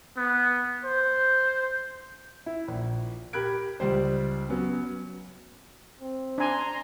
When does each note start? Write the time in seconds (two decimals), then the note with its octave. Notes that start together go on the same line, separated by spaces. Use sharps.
0.17 B3
0.85 C5
2.46 E4
2.68 A#1
3.33 G4 A#4 B5 F#6 G#6 D7
3.80 C#2 G3 C5
4.49 F#3 B3 C#4
6.01 C4
6.38 D4 G#5 A#5 C6